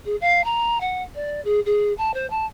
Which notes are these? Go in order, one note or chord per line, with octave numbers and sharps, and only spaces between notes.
G#4
F5
A#5
F#5
D5
G#4
G#4
A5
C5
A5